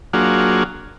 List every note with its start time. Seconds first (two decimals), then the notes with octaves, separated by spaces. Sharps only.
0.13 F#3 A#3 D4 F4 F#4 G#4